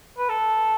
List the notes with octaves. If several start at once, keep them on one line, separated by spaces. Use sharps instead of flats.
B4
A4